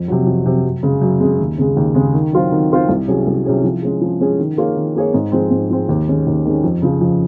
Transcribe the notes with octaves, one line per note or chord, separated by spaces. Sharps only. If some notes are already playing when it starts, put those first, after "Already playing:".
Already playing: F2
C3 F#3
F2
C3 F#3
F#2
C#3 G#3
F#2
C#3 G#3
D#2
C#3 G#3
D#2
C#3 G#3
D#3
F#3 C4 F4 C5
D#3
F#3 C4 F4 C5
C2
C3 F#3 C#4 G#4
C2
C3 F#3 C#4 G#4
F3
G#3 C#4 G#4
F3
G#3 C#4 G#4
D#3
A#3 F4 G#4 C#5
D#3
A#3 F4 G#4 C#5
G#2
F3 G#3 C4
G#2
F3 G#3 C4
D#2
D#3 G#3 C#4
D#2
D#3 G#3 C#4
F2
C#3 F3
F2